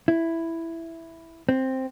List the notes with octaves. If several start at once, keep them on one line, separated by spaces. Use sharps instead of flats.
E4
C4